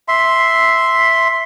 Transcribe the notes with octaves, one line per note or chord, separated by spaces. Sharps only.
E5 C6